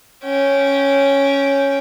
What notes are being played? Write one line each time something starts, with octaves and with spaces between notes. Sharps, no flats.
C#4 G5